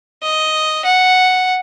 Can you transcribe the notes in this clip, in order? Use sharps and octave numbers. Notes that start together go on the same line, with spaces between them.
D#5
F#5